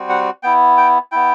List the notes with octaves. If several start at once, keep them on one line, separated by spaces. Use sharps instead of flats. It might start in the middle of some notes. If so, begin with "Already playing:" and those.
Already playing: G3 C4 F#4
F#5
B3 E4 G5
G5
B3 E4 G5